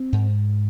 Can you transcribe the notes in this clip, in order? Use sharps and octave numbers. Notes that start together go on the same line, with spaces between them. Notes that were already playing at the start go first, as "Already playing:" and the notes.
Already playing: C4
G#2